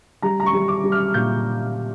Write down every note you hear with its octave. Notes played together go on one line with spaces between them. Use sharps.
G3 A#5
A#5
C#6
G3
D6
G3
F6
A#2 G6